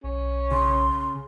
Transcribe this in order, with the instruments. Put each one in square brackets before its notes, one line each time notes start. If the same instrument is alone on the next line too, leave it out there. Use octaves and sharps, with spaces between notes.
[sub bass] B1 [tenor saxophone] C#4
[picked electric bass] C#3 [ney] C6